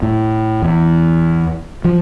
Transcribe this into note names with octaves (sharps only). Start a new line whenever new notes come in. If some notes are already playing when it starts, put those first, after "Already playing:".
A2
E2
F3